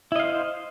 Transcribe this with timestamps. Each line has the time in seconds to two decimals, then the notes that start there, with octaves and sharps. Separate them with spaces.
0.12 E4
0.16 D#5
0.20 F5
0.23 C5